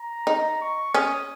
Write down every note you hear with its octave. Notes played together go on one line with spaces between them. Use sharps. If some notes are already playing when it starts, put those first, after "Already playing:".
Already playing: A#5
D#4
C#6
C#4 D#6